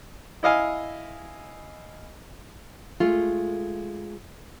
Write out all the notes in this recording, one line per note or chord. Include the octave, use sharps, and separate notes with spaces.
E4 D#5 F5 G#5
G#3 A3 F4